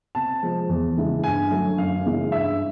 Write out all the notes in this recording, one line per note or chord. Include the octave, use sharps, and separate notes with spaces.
C3 A5
F3 G#3
E2
C#3 E3 G#3
G2 G#5
D3 F#3 A3
F#2 F5
C#3 E3 G#3
G2 E5